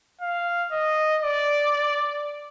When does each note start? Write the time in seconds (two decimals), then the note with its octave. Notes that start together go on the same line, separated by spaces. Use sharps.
0.21 F5
0.72 D#5
1.22 D5